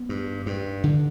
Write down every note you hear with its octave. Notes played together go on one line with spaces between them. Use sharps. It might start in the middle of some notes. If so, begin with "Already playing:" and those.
Already playing: B3
G2
G2
D3